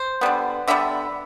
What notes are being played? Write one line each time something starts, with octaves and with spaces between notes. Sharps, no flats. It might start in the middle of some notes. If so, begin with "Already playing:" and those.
Already playing: C5
D3 G3 B3
D3 G3 B3 E5